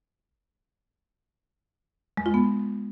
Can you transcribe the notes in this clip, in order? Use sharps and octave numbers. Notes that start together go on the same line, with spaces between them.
G#3
F4
B3